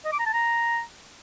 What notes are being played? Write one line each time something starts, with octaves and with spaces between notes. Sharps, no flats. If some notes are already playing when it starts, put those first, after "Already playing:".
D#5
D6
A#5
A5
A#5